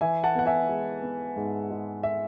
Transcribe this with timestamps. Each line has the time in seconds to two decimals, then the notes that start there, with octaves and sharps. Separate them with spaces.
0.01 E3 E5 G#5
0.24 F#5 A5
0.35 B3 F#5
0.46 E5 G#5
0.69 G#3
1.02 B3
1.36 G#2
1.71 G#3
2.03 E5